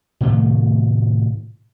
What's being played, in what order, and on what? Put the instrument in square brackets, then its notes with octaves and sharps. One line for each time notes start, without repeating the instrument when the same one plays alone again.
[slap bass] A2 C3 D#3 A3